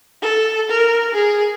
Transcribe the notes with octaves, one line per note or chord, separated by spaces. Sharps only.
A4
A#4
G#4